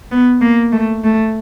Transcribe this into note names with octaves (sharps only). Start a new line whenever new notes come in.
B3
A#3
A3
A3